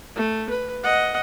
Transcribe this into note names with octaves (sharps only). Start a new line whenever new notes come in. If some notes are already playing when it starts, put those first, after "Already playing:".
A3
B4
D#5 F#5